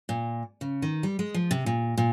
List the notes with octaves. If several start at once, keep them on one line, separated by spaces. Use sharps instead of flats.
A#2
C#3
D#3
G3
G#3
F3
C3
A#2
A#2